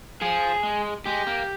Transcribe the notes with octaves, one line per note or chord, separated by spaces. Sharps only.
F3 G#4
G#3
G#3 G4
A#3